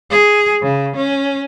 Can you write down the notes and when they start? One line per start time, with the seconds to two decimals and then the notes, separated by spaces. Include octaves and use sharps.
0.10 G#4
0.63 C#3
0.96 C#4